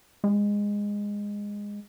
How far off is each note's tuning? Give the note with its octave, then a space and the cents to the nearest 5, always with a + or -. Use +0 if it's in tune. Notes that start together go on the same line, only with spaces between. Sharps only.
G#3 -15